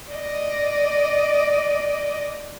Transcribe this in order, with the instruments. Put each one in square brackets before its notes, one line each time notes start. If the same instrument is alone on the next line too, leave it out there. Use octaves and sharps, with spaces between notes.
[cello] D5 D#5